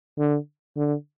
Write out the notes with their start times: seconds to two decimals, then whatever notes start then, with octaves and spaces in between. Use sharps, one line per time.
0.19 D3
0.77 D3